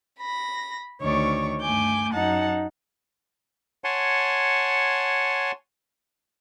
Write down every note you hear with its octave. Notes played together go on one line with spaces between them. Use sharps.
B5 A#6
D2 D#3 C#5 D5 C#6
G2 A3 G#5 D6 G6
F#2 D#4 F#5 A5 A#5
C#5 F#5 G#5 A5 C6